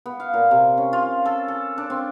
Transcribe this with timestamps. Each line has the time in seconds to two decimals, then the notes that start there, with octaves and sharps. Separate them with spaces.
0.06 B3
0.20 F5
0.34 A#2
0.51 C3
0.78 C#4
0.93 F4
1.25 A4
1.48 A4
1.78 D4
1.90 C4